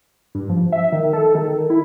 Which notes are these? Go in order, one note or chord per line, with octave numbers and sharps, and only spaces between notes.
G2
F3
E5
D#3
A4
D#3
E4